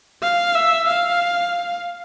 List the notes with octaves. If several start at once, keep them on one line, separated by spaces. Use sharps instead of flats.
F5
E5
F5